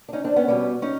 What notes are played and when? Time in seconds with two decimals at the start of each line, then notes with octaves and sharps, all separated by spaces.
0.08 D4
0.13 C#4 D#4
0.24 C4 D4
0.36 B3 C#4
0.48 B2 G3 B3
0.82 C#4 D#4